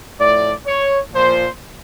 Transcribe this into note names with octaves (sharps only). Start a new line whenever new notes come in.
A2 F3 D5
C#5
A#2 F3 C5